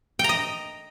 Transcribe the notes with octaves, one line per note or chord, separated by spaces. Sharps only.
D#5 G5 A#5